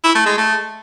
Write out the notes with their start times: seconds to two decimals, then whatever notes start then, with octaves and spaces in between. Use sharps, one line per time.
0.04 E4
0.15 A3
0.26 G#3
0.37 A3